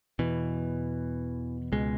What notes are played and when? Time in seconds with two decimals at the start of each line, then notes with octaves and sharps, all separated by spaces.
0.19 E2 B2 E3
1.72 C#2 B2 G#3